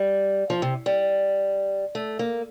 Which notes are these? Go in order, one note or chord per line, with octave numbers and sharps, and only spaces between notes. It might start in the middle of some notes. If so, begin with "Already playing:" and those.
Already playing: G3
F3
C3
G3
A3
A#3